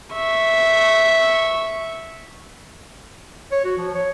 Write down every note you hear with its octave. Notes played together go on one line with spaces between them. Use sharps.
E5 C#6
C#5
F#4
F3
C#5